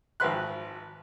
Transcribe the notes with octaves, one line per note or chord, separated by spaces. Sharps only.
G#1 F3 F#4 B4 C6 F#6